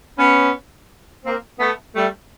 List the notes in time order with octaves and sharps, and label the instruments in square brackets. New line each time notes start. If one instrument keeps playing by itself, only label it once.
[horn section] B3 C#4
A#3 C4
A3 B3
G3 A3